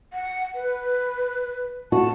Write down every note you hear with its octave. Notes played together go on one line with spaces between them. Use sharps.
F#5
B4
F#4 A5